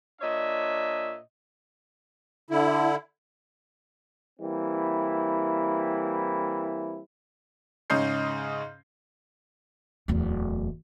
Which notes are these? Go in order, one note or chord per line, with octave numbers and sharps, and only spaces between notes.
A#2 D4 C#5 D#5 E5
D3 E4
E3 G3 A#3 C4 E4
G#2 C#3 C#4 D#5 G6 C7
D1 E2